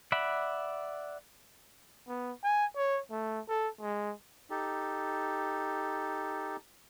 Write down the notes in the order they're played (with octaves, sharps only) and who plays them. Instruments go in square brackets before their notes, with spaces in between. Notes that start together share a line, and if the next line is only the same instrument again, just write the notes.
[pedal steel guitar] D5 E5 F#5 B5
[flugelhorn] B3
G#5
C#5
A3
A4
G#3
[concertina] D#4 G4 A4